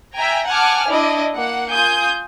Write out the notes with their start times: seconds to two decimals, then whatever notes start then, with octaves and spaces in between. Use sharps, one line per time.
0.14 E5 G5 G#5 A#5
0.46 F#5 G#5 A5 D6 F6
0.87 D4 E4 D5 D#5
1.35 A#3 F#5
1.71 F4 G#5 D#6 G6